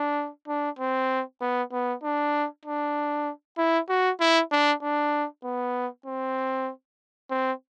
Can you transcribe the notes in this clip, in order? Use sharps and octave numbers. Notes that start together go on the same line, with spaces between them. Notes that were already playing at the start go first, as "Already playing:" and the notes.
Already playing: D4
D4
C4
B3
B3
D4
D4
E4
F#4
E4
D4
D4
B3
C4
C4